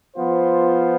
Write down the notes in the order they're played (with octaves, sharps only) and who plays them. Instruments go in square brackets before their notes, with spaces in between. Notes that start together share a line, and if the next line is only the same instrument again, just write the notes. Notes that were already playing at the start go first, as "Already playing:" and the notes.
[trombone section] F3 B3 F4 C5